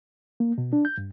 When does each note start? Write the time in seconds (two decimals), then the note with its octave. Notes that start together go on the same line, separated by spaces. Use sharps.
0.40 A#3
0.58 B2
0.73 D4
0.85 G6
0.98 G2